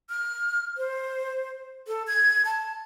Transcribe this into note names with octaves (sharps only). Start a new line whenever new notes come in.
F6
C5
A4
G#6
A5